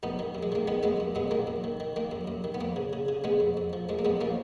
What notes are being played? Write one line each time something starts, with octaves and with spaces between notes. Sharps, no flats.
F#2 B3 D#4
D#3
F#2
G#3
D#3 A#3
D#3 G#3 B3
F#2 G#3 B3
F#2
F#2 G#3 B3
D#3 A#3
F#2
D#3
D#3
D#3 A#3
F#2
F#2
D#3
B3
F2 A#3
C#3
C#3
C#3
C#3 G#3 B3
F2
F2
F3
F#2 G#3
A#3
F#2 G#3 B3
F3 A#3 C#4